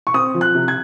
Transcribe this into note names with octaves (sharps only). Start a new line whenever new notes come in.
C#6
C4 D#6
F3
F#6
C3
G#6